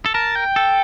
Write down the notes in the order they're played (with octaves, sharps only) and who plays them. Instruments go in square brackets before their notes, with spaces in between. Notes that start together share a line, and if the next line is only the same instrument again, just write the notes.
[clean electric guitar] A4
[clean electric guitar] A#4 [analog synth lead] A5
[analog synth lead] G5
[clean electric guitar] A4